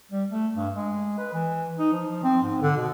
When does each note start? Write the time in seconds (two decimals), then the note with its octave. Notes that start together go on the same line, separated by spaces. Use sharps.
0.12 G3
0.29 A3
0.56 G2
0.75 G#3
1.18 B4
1.33 E3
1.78 D#4
1.93 F3
2.23 C4
2.43 G#2
2.61 D3
2.77 B2